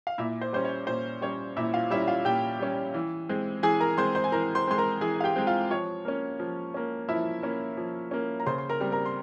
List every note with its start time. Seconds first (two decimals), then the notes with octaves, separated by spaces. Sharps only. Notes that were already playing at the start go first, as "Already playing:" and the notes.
0.07 F5
0.18 A#2 E4 E5
0.41 C5
0.53 G3 C#4 C5
0.64 C#5
0.87 A#2 C5
1.21 G3 C#4 C#5
1.57 A#2 E4 E5
1.74 F4 F5
1.90 G3 E4 E5
1.94 C#4
2.08 F4 F5
2.25 A#2 G4 G5
2.59 G3 C#4
2.94 E3
3.29 G#3 C4
3.63 E3 G#4 G#5
3.80 A#4 A#5
3.98 G#3 C4 C5 C6
4.15 C5 C6
4.24 G#5
4.32 E3 A#4 A#5
4.55 C5 C6
4.67 G#3 C4 C6
4.78 A#4 A#5
5.01 E3 G#4 G#5
5.20 F5
5.24 G4 G5
5.36 G#3 C4
5.47 F4 F5
5.70 F3 C#5
6.05 A#3 C#4
6.40 F3
6.74 A#3 C#4
7.08 F3 E4 E5
7.43 A#3 C#4
7.77 F3
8.11 A#3 C#4
8.40 A#5
8.46 C#3 C5 C6
8.58 C6
8.69 A#4 A#5
8.81 G3 C4
8.92 A#4 A#5
9.06 C6